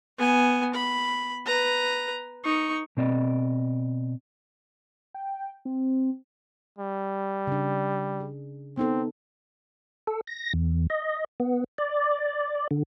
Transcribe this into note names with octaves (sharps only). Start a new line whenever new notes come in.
B3 G#5
B5
B4 A#5
D#4 C#6
B2 C4 D5 D#5
G5
C4
G3
C#3 D4
G#4
B3 C4 D#4 A4
A4
A#6
E2
D#5
B3
D5
D3